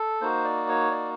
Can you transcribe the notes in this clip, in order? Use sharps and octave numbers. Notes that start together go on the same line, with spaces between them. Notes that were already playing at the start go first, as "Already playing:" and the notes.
Already playing: A4
A#3 D#4 F#4 C5
D5
C#5
D5